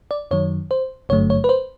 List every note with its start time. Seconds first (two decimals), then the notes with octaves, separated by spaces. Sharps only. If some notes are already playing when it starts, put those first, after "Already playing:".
0.11 D5
0.31 F#2 D#3 F#3 C#5
0.71 C5
1.09 G#1 G2 D3 F#3 A3 C#5
1.30 C#5
1.44 B4
1.49 C5